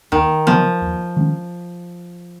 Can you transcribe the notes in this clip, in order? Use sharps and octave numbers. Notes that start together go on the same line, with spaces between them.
D#2 D#3
C#3 F3 F#3 B3
D#2
D#3 G#3 C#4